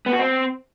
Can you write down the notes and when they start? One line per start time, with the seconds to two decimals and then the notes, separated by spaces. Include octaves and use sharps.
0.06 B3
0.13 F#4
0.19 C4